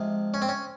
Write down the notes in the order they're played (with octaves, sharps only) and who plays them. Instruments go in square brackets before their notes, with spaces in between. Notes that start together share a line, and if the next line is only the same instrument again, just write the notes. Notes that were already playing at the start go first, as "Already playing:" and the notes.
Already playing: [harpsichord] C3 F3 G#3
C#4
C4
C#4